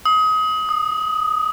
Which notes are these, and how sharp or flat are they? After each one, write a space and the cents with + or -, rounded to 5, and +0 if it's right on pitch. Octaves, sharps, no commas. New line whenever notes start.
D#6 +25
D#6 -20